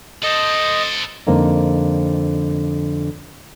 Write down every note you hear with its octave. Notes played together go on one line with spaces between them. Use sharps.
A4 C5 D#5
F2 D3 A#3 C4 D#4